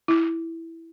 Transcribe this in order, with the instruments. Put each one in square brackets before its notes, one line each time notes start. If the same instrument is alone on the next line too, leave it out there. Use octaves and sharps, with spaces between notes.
[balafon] E4